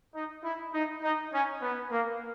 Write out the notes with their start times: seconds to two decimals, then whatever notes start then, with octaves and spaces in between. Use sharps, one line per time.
0.14 D#4
0.43 E4
0.73 D#4
1.03 D#4
1.33 C#4
1.62 B3
1.92 A#3